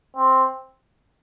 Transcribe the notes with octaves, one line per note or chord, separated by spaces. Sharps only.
C4